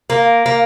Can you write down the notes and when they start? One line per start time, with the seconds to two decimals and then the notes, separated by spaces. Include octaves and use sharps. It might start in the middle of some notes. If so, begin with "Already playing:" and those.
0.10 A#3
0.46 A#3